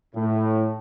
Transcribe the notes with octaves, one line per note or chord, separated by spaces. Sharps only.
A2